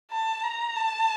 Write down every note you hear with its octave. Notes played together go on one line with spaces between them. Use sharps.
A5
A#5
A5